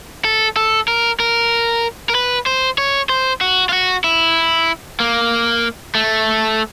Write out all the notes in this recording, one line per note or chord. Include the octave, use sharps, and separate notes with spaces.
A4
A4
A#4
A#4
A#4
B4
C5
C#5
C5
F#4
F4
F#4
E4
A#3
A3